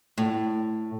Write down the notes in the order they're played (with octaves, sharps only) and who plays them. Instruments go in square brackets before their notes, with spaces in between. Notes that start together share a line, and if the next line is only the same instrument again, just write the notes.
[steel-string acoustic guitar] A2